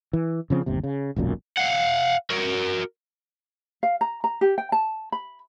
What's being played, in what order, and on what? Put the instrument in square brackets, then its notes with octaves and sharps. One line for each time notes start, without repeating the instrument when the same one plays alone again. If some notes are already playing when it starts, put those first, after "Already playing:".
[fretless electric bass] E3
C#3 F3 C4
G1 D#2 C3
C#3
E1 B1 F#2 A#2
[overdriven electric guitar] F5 F#5
F#4 A#4
[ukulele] F5
A#5
A#5
G4
G5
A5
B5